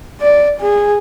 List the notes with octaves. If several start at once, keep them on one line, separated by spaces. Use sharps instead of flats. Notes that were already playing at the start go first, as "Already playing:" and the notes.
D5
G#4